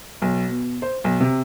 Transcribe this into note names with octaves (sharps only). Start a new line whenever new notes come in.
B1
B2
C5
B1
C3